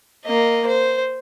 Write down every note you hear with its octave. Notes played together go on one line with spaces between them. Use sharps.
A#3 D#5
C5